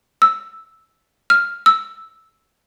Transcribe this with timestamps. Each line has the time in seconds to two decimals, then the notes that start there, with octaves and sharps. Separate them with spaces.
0.22 E6
1.30 F6
1.66 E6